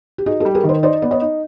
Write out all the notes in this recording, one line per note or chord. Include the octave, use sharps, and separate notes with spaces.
G4
D#4 F#4 G#4
G4 A4
G3
G#4 A#4
D#3
A#4 C5
D#4 C5 D5
B3 D5
C#5 D#5
D#4